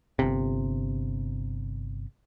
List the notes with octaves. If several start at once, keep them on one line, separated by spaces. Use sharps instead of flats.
G1 C3